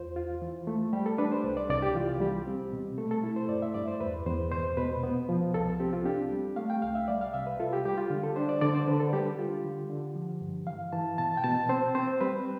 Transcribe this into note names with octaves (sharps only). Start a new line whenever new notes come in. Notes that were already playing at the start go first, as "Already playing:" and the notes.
Already playing: E2 F4 C5
F4
E3
A3
G3 G4
A4
D4 B4
C5
C2
D5
C2 D5
G4
E3 F4
G3 G4
C4
B2
A3 A4
A4
E4
C5
G2 D5
E5
G2 D5
C5
E2 B4
E2 C5
B2 C5
B2 B4
B3
F3
C2 A4
C4 G4
F4
D4 G4
G3
A3 F5
G5
C2 F5
E5
G3 D5
F5
C3 E5
B4
F4 A4
G4
G3 G4
F4
D3
A4
D4 C5
D5
D3 D5
C5
D3 B4
A4
G3 G4
F4
D3
D3
F3
G2
E3 F5
E3 A5
B2 A5
G5
B2 A5
C4 C5
C4 C5
G3 B4